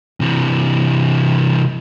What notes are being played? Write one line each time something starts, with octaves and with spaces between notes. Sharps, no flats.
C3 E3